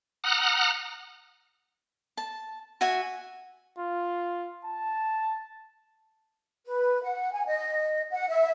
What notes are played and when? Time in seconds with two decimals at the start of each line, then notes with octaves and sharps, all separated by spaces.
0.24 F#5 A#5 D#6 F6 F#6
2.17 A5
2.81 F#4 E5 G#5
3.79 F4
4.65 A5
6.66 B4
7.04 F#5
7.34 G#5
7.46 D#5
8.11 F#5
8.29 E5